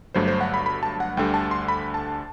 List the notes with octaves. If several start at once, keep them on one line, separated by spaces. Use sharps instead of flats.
G1 G2 F#3 A3 C5
C5
F#5
B5
B5
A5
F#5
D2 D3 G3 G5
A5
C6
B5
A5